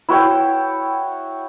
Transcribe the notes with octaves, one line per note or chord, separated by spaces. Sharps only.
E4 F#4 C#5 G5